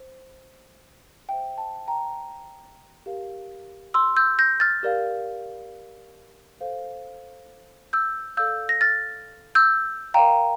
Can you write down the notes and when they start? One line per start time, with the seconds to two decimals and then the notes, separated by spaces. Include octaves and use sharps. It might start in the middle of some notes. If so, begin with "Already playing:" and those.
Already playing: C5
1.29 C5 E5 G5
1.58 A5
1.88 G5 A#5
3.06 G4 A#4 F5
3.94 C6 E6
4.16 E6 G6
4.39 G6 A#6
4.60 F6 A6
4.83 G4 A#4 D5 F5
6.61 A4 C5 F5
7.93 E6 G6
8.37 A4 D5 F5 E6 G6
8.69 A#6
8.81 F6 A6
9.55 E6 G6
10.14 A#4 D5 F5 G5 A#5